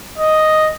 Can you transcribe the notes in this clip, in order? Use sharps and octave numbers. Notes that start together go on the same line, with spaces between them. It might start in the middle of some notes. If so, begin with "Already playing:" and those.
D#5